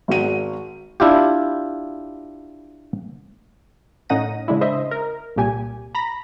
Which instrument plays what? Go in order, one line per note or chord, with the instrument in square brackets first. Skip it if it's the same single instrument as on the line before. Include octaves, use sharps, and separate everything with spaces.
[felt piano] G#1 F#4 D#7
[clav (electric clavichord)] D4 E4 F4 G4
[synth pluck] A2 C#4 D#4 F#5 A#6 D#7
C#3 G#3 D4 E4
C5 D#5 E5
A#4
C2 A#2 G4 G#5
A#5 B5 A#6